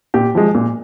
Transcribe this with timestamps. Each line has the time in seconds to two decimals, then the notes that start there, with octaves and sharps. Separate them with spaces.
0.14 A#2 G4
0.35 F3 G#3
0.55 A#2